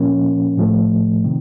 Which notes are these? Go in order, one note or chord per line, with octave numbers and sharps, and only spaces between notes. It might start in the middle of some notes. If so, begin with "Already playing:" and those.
Already playing: A#2 F3 A#3 C#4
A2 F3 A3
C3 D#3